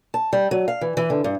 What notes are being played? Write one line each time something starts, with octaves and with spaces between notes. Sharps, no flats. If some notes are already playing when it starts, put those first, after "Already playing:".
A5
G3
F#3
F5
E3
E3
D3
G2